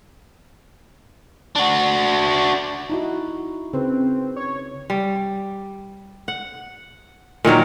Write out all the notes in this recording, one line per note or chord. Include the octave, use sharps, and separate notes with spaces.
D4 F#4
D#4 E4 F#4
C#3 C4 B4
C#5
G3
F#5
A#2 D#3 F#3 A#4